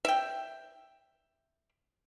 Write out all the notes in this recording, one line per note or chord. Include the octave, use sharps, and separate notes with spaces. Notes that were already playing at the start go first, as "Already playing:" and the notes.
E5 G5